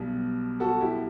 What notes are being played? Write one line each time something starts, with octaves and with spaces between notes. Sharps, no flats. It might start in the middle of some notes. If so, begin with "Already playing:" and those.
Already playing: B1 B2 G3
F#4 A4
E4 G4